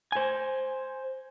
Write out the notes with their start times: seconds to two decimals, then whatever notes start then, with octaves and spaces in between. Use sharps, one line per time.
0.12 C5 G#5